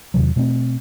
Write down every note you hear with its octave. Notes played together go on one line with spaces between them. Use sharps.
E2 C3 D#3 F#3
B2 A3 A#3 C4